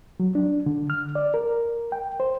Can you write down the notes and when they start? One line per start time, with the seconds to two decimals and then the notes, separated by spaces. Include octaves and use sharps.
0.20 F#3
0.35 D4
0.66 D3
0.90 F6
1.15 D5
1.34 A#4
1.92 G5
2.20 C5